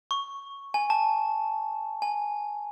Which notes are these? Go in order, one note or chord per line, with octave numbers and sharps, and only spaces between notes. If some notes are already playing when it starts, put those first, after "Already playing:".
C#6
G#5
A5
G#5